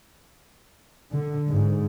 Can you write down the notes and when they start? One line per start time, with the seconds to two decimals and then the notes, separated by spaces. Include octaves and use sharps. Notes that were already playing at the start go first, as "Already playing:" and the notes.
1.13 D3
1.51 G#2